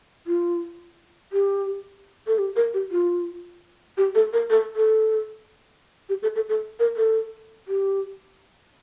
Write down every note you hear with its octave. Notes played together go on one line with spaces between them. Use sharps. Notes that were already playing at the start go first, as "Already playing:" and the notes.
F4
G4
A4
G4
A#4
G4
F4
G4
A4
A#4
A4
A4
G4
A4
A4
A4
A#4
A4
G4